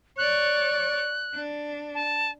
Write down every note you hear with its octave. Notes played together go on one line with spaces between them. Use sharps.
C#5 D5 F#6
D4
A5